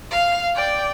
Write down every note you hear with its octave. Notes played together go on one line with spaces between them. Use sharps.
F5
D5 G5